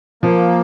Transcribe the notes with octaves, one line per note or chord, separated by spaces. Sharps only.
F3 A#3